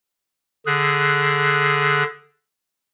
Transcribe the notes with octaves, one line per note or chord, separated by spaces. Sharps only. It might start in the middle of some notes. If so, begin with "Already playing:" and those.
D3 G#4 F#6